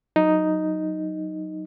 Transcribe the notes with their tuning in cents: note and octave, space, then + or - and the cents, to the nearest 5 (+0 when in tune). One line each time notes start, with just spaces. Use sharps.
F#3 +0 D#4 +0